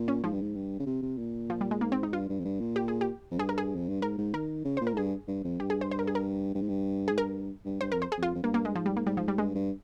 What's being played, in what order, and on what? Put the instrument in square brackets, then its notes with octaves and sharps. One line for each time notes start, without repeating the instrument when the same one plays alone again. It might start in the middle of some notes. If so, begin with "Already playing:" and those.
Already playing: [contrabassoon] A#2
[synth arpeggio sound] C#4
[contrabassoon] G#2 [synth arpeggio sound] F3
[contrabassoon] G2
G#2
G2
C#3
C3
C3
A#2
[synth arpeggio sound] F3
G3
G#3
[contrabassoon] G#2 [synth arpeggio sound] A#3
[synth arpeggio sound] C4
D#4
[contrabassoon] G2 [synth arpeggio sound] F4
[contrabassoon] G2
F2
G2
A#2
[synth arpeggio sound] G4
G#4
G4
[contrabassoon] F2
[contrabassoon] G2 [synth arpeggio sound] G#4
[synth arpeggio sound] A#4
G#4
[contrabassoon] F2
G2
[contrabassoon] G#2 [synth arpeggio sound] A#4
[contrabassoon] G#2
[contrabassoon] D#3 [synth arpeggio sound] A#4
[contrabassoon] C#3
[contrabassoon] A#2 [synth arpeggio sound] C5
[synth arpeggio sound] A#4
[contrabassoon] G#2
[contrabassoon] G2 [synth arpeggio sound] G#4
[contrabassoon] G2
F2
[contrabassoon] G2 [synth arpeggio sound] G4
[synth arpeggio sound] G#4
C5
C5
A#4
G#4
A#4
[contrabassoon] G2
G#2
G2
[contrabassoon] G#2 [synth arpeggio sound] G#4
[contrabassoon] G2 [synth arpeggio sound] A#4
[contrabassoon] G2
[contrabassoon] G2 [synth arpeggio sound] C5
[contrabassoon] F2 [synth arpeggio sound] A#4
[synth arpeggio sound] C5
G#4
[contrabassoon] F2 [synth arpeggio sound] F4
[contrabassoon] F2
[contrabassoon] G2 [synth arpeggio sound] A#3
[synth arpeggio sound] A#3
G#3
[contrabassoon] G#2 [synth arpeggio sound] F3
[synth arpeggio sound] G3
A#3
[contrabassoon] G#2 [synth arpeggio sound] G3
[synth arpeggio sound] F3
G3
[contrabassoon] G2 [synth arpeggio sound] G#3
[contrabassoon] G2